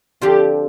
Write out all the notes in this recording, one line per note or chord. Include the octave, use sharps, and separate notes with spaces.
D3 F3 C4 F4 G4 C5